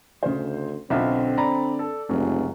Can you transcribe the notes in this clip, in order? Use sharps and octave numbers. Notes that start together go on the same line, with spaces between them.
D2 C#3 C5
B1 D3 C4 C#4 F4 E5
D5 A#5 B5
A4
F1 C#2 F#2